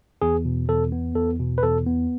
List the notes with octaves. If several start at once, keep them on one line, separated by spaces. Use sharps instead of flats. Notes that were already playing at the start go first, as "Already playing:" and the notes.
E2 G#4
B2
E2 A4
B3
E2 A4
B2
B4
E2 A4
B3